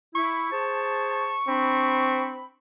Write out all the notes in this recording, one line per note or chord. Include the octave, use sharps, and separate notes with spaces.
E4 C#6
G#4 C5 A5
C4 D4 B5